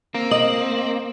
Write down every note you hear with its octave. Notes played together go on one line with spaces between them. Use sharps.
A#3 C4
D#5 F#7